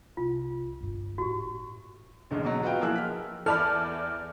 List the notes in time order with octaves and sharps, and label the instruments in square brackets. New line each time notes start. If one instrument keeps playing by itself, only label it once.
[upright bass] C2 [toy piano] F4
[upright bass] G1 A#2
[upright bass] A2 D#4 [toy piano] F#4 G4
[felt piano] E1 A1 D2 G#2 C#3
B2 F#3
F4 F#4 B4 D#5 F5 G5
F3 A#3 E4 G#4 E6 F#6
F6 B6
[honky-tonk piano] E2 D5 [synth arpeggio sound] A4 A5 B5 [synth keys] F6